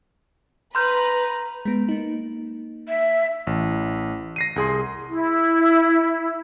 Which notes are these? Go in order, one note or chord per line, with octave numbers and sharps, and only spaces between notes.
B4 A#5 C6 F6 G6
G#3 B3
A#3 D#4
E5
A1
A#6 C7 D#7
C2 G#4 C6
E4